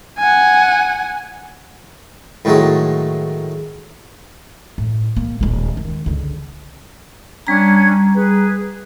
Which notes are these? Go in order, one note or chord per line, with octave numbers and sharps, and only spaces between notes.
F#5 G#5
A2 D#3 F#3 G#3
A2
A#3
D#1 G#3
D#3
C#2 D3
G3 C#4 D4 A#5 G#6
G#4 B4